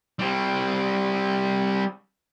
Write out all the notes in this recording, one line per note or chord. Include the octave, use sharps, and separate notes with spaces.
G3 C4